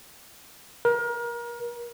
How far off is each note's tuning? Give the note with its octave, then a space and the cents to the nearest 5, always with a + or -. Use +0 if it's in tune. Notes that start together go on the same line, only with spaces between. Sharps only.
A#4 +30